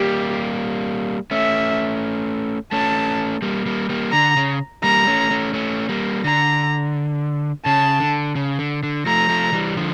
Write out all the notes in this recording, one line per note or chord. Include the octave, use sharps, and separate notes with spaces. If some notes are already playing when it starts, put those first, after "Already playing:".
Already playing: G3 A#3 G4
A3 C#4 E5
A3 C#4 A5
G3 A#3
G3 A#3
G3 A#3
D3 A#5
C#3
G3 A#3 A#5
A3 C#4
A3 C#4
A3 C#4
G3 A#3
D3 A#5
C#3 A5
D3
C#3
D3
D3
F3 A3 A#5
F3 A3
E3 G3
D3 F3